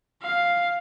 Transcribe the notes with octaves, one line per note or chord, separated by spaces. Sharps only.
F5